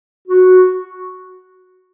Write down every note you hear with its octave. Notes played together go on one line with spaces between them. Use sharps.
F#4